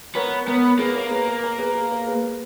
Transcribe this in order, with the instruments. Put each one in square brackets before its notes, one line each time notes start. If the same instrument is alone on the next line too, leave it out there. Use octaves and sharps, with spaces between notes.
[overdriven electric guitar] B3 [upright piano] A#4 C#5
[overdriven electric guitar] B3 [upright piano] A#4 C#5
[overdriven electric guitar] A#3 [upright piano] G#4 B4
[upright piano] A#4 C#5
G#4 B4
A#4
A#4
G#4 B4
G#4
A#4
G#4 B4